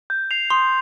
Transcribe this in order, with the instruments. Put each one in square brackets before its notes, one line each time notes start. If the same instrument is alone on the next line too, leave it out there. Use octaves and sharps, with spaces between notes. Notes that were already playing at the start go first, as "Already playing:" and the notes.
[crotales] G6
C7 F7
[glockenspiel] C6 [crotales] D#6